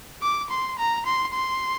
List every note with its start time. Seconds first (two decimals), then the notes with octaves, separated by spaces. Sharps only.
0.22 D6
0.50 C6
0.79 A#5
1.06 C6
1.34 C6